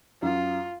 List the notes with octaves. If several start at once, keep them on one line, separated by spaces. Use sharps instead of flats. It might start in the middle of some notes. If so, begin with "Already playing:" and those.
F#2 F4